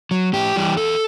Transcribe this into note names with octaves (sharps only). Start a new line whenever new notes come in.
F#3
A2 G4
E3 G3
E2 A4